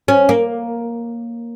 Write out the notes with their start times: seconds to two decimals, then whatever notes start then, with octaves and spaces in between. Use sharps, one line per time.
0.08 C#4
0.29 A#3